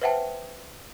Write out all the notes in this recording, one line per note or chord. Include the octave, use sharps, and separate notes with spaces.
B4 C5 E5 F#5 G5 A5